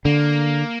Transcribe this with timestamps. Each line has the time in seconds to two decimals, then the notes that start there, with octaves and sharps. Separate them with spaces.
0.05 D3 A#3